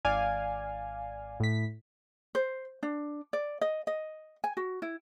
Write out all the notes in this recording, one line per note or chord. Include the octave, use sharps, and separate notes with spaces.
G#1 D5 F5 G#5
A2 B6
C5
D4
D5
D#5
D#5
G#5
F#4
E4